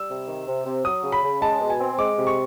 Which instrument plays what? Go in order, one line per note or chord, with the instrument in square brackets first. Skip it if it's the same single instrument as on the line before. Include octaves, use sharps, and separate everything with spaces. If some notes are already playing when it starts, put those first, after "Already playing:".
Already playing: [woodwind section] G3 [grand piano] E6
[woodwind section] C3
D#3
C3
C3
[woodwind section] F#3 [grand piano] D#6
[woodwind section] C#3
[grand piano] B5
[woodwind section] C#3
[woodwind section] G#3 [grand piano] A5
[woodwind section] B2
[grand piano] G#5
[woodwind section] C4
[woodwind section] G#3 [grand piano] D6
[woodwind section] C3
[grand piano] C#6